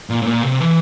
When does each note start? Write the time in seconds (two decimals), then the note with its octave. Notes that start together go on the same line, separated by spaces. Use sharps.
0.10 A#2
0.22 A2
0.26 A#2
0.43 C3
0.60 E3